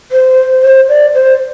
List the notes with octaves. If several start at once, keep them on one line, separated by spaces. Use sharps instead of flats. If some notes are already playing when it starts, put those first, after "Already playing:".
C5
C5
D5
C5